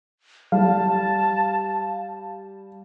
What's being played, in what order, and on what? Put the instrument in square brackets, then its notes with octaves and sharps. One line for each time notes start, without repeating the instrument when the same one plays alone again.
[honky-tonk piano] G3 [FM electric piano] F5 [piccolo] A5